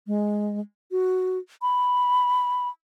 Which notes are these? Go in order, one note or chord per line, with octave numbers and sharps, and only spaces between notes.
G#3
F#4
B5